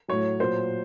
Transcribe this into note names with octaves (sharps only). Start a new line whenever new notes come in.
A2 F#3 C#5
A#2 F#3 C5